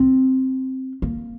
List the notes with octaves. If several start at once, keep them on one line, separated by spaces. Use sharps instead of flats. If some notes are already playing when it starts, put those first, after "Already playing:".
Already playing: C4
A#3